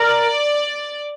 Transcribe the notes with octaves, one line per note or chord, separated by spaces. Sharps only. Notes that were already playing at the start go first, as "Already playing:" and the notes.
Already playing: A#4 D5